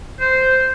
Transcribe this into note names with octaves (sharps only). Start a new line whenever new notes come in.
C5